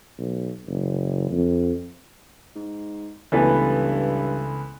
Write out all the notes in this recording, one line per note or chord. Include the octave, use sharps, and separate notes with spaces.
B1
F#1
F2
G#2
C#2 G2 E3 A3 B3 B4